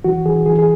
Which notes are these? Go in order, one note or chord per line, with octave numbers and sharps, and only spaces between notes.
E3 F#4
E3 G#4
E3 G#4
G#4